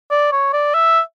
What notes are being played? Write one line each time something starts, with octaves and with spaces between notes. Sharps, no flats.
D5
C#5
D5
E5